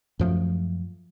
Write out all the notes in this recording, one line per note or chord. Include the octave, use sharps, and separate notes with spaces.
F#2 F3 A3